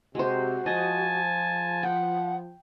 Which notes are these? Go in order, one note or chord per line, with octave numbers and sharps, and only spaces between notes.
C3 G#3 F#4 C5
F3 D#5 G#5 A5
F#5 G5